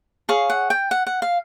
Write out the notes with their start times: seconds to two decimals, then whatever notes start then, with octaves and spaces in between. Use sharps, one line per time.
0.29 G#4 C#5 F5
0.50 F#5
0.70 G5
0.91 F#5
1.07 F#5
1.22 F5